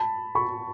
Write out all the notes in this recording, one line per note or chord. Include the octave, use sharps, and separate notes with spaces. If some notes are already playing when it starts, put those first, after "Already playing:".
Already playing: A5 B5
B5 C#6